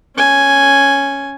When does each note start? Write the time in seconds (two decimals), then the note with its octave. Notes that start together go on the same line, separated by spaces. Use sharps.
0.16 C#4 G#5